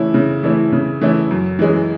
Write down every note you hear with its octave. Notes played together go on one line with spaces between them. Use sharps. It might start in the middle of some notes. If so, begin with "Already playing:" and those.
Already playing: C#3 E3 A3 C#4 E4
C#3
E3 A3 C#4 E4
C#3
E3 A3 C#4 E4
F#2
E3 G#3 C#4